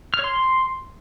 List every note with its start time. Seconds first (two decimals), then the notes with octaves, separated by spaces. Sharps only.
0.14 F6
0.19 C#5
0.24 C6